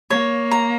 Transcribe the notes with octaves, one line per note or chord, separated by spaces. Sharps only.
A#3 C#5
A#5